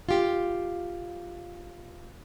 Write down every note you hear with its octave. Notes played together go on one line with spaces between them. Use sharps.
F4 G4